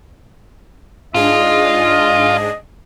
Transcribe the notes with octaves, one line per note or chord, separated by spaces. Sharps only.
G#2 D4 F4 G#4 D#5